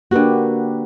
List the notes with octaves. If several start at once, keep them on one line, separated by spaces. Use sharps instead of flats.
D3 A#3 F#4 G4 B4